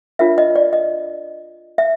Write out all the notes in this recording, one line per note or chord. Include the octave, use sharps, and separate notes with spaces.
D4 F4 A#4 C#5 E5
D#5
D5
D#5
E5